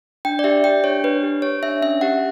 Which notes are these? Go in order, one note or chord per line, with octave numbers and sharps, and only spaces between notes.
D4 G5
D5
G4 E5
G4 G5
D4 C#5
D4 B4
G4
G4 C#5
D4 E5
C#4 E5
G4 F#5